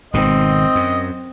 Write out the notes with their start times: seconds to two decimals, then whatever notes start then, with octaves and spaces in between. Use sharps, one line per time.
0.14 G#1 B2 D#3 C4 D#5
0.75 F#2